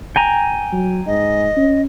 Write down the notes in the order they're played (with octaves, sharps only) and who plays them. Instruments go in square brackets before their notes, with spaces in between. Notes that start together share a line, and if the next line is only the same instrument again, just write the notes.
[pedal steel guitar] G5 G#5 A#5
[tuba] F#3
[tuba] G#2 [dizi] D#5
[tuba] C#4